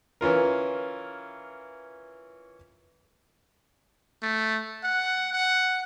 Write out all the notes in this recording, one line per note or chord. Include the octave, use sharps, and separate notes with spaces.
E3 C#4 F4 A#4
A3
F#5
F#5